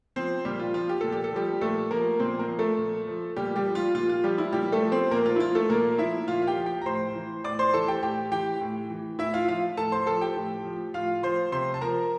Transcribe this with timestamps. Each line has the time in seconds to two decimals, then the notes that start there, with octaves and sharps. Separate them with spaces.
0.16 F3 C4 C5
0.45 A#2 G3 G4
0.59 F4
0.74 F3 F4
0.89 G4
1.01 A#2 A4
1.12 G4
1.24 A4
1.33 F3 G3 G4
1.61 A#2 A3 A4
1.91 F3 A#3 A#4
2.20 A#2 C4 C5
2.39 A#3 A#4
2.49 F3
2.59 A3 A4
2.78 A#2
3.07 F3
3.36 A#2 G3 G4
3.56 G3 G4
3.65 F3
3.75 F4
3.94 A#2 F4
4.09 F4
4.24 F3 G3 G4
4.38 E4
4.53 A#2 G3 G4
4.72 A3 A4
4.82 F3
4.92 C4 C5
5.11 A#2 A#3 A#4
5.26 F4
5.36 E4
5.40 F3 F4
5.55 A3 A4
5.70 A#2 A#3 A#4
5.98 F3 E4 E5
6.28 A#2 F4 F5
6.42 F5
6.47 G4 G5
6.57 F3
6.66 G4 G5
6.81 A#5
6.86 A2 C5 C6
7.15 E3
7.44 A2 D5 D6
7.59 C5 C6
7.73 E3 A4 A5
7.88 G4 G5
8.03 A2 G4 G5
8.32 E3 G4 G5
8.61 A2
8.90 E3
9.19 A2 E4 E5
9.34 F4 F5
9.48 F3 F4 F5
9.77 A2 A4 A5
9.92 C5 C6
10.06 F3 A4 A5
10.21 G4 G5
10.36 A2
10.65 F3
10.94 A2 F4 F5
11.23 F3 C5 C6
11.52 C3 C5 C6
11.74 A5
11.81 F3 A#4 A#5